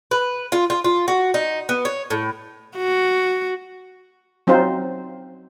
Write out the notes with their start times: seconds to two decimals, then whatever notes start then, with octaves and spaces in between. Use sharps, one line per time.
0.11 B4
0.52 F4
0.70 F4
0.84 F4
1.08 F#4
1.34 D#4
1.69 B3
1.85 C#5
2.10 A2
2.77 F#4
4.47 F#3 C4 D#4 F4 C5